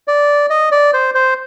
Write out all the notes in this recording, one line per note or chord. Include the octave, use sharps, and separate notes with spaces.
D5
D#5
D5
C5
C5